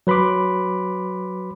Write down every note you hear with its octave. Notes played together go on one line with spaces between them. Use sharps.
F#3 B4 B5 C6 D6